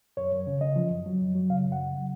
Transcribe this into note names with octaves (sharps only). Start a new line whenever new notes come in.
F#2 C#5
F#2
C#3
C#3 D#5
F3
F#2
F#3
F#2
F#3
C#3 F5
F#2
F#5
C#3
F#3